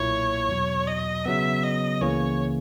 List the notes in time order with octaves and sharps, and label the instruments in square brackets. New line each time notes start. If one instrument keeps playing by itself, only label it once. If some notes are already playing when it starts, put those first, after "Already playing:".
Already playing: [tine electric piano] B1 A#2 A#3 E4 [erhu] C#5
[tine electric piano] E2 B2 F#3
[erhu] D#5
[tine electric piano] C#3 F#3 B3 [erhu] E5
[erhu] D#5
[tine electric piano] C#2 C#3 E3 A#3 C#4 [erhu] C#5